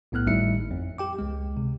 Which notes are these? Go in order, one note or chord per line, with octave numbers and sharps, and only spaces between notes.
B1 A2 B3 F6 F#6
G#1 A2 G3 D#4 E5 C#7
F2
G4 G5 D6
C#2 G#3
C3